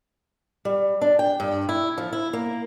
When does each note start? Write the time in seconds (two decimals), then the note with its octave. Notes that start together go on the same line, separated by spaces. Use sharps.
0.65 G3
1.02 D4
1.19 G5
1.40 G2
1.69 E4
1.98 F3
2.13 E4
2.33 A#3